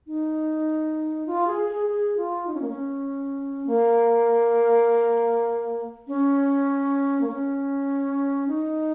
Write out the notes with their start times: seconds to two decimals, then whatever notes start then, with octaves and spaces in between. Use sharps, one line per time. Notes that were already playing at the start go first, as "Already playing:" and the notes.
0.07 D#4
1.27 F4
1.47 G#4
1.66 G#4
1.87 G#4
2.17 F4
2.47 D#4
2.54 C#4
2.61 A#3
2.69 C#4
3.67 A#3
6.08 C#4
7.21 A#3
7.28 C#4
8.48 D#4